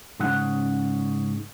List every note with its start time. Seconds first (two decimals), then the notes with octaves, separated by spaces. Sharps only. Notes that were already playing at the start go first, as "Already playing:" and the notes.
0.20 G#2 C#3 C#4 G#4 F#5